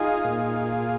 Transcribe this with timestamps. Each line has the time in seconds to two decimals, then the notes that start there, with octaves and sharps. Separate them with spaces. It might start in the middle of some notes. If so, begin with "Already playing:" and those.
Already playing: D#4 F4 G#4
0.24 A#2